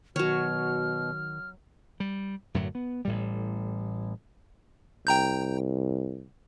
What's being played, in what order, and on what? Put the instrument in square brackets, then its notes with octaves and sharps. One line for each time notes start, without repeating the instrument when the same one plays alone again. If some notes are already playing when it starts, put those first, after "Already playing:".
[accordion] B2 [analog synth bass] D#3 [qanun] F#3 C#5 [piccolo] F6
[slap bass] G3
F#2 A2 D3 F#3
B3
A1 A2 G3
[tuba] C2 [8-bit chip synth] G5 A#5 G6